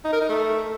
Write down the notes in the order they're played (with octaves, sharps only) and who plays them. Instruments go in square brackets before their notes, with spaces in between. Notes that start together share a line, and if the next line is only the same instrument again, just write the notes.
[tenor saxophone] D#4
A#4
D#4
A3